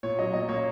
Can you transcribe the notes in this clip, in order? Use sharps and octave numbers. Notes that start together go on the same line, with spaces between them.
A#2 C#5
F#3 D#5
A#2 D#5
A#3 C#5